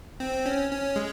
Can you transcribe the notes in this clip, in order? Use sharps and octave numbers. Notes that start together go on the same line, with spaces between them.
C4
C#4
C#4
G#3